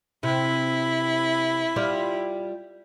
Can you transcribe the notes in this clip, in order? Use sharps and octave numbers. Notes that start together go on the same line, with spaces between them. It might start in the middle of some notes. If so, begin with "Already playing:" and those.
C3 E4
G3 F4 D5